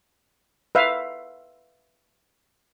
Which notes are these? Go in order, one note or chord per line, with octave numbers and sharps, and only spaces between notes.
B4 E5 F5